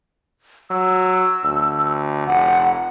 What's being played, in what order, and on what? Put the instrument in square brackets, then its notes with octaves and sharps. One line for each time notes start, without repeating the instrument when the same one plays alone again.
[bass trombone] F#3 [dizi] E6
[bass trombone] D2
[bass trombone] F1 [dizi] F#5